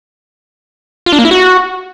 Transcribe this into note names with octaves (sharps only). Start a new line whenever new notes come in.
F4
D4
A#3
E4
F#4